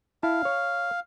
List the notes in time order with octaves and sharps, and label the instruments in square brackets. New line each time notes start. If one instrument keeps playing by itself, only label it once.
[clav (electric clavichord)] E4 A5 [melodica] F5
[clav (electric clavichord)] C#5